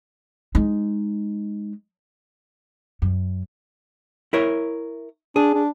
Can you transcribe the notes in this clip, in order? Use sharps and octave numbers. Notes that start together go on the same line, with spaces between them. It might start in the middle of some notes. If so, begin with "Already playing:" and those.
G#3 D#4
F#2
E4 A#4 C#5
D4 G#4
D4